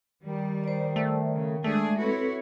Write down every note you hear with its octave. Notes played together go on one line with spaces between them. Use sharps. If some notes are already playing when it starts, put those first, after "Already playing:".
D#3 G3
C5 D5
A3
C#3
G#3 A3 D4 G#4
C4 E4 F#4 A4 B4 C#5